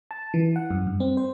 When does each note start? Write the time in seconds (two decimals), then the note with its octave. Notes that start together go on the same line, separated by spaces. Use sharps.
0.11 A5
0.34 E3
0.56 F#5
0.70 F#2
0.87 G2
1.00 C4
1.17 C5